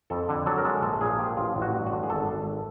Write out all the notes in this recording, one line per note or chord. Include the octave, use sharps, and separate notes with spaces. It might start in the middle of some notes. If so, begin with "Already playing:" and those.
F2 A4
D3
F#3 A4
A#4
G#3 A4
A#1 A4
A#2 G#4
F3 G4
A1 F4
A1
F#4
G2
D3 F#4
G#4
G#1 A4
G#1